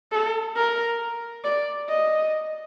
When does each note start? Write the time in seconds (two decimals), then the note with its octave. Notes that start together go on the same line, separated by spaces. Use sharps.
0.12 A4
0.56 A#4
1.44 D5
1.88 D#5